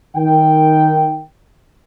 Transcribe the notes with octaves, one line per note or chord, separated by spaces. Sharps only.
D#3 G5